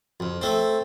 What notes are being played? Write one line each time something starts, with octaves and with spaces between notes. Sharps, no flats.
F2
A3 C4